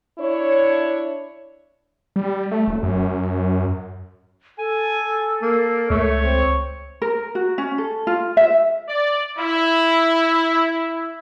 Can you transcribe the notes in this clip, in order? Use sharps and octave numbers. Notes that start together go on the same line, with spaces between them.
D4 E4 C#5
G3
A3
D#1
F#2
A4 G#5
A#3
C#2 A3 C#5
C4
A#4
F#4
C#4
A4
F4
E5
D5
E4